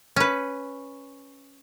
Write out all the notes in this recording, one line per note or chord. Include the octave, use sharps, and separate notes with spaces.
C#4 B4